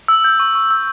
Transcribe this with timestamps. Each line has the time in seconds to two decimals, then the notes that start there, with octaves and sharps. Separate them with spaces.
0.08 E6
0.24 G6
0.39 C#6
0.55 C#6
0.71 E6